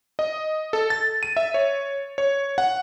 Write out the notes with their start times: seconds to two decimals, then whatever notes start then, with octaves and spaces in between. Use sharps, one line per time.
0.19 D#5
0.73 A4
0.90 A6
1.23 D#7
1.37 E5
1.54 C#5
2.18 C#5
2.58 F#5